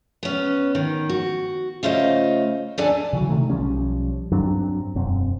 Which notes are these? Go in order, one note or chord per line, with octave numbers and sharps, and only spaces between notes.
B3 C#4
D#3
F#4
C#3 A3 F4 C5 D#5
D#2 D4 A4 D5 G#5 A5
C#3 E3 F#3
C3 D#3 A3
B1 F3 G3 C#4
G2 F#3 C4 D4
E1 F#2 C4